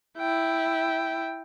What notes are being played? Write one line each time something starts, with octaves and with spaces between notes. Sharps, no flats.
E4 G5